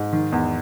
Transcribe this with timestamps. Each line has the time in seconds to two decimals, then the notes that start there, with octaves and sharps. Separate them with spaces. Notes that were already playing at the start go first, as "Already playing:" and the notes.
Already playing: G#2
0.13 D#3
0.32 E2